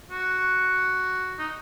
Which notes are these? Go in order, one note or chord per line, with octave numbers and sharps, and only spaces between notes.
F#4
D#4